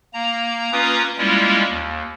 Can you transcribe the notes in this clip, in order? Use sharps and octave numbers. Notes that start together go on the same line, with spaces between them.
A#3 A#5
A#3 C#4 F4 B4 A#5 D#6
G3 G#3 A#3 C#4 E4 F4
D#2